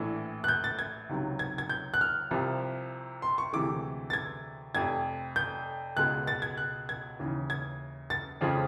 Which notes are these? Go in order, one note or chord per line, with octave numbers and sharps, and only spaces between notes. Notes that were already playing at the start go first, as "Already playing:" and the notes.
Already playing: A#1 A2 E3
F#6
G6
A6
G#6
C#2 C3 D#3 F#3
G#6
G#6
G6
F#6
F6
C2 C3 F3
C6
C#6
D2 C3 E3 G#3 D6
A6
G#6
F1 F2 C3 G#6
G6
C#2 B2 G#3 F#6
A6
G#6
F#6
G#6
D#2 C#3 E3
G#6
A6
F2 C#3 F3 G#3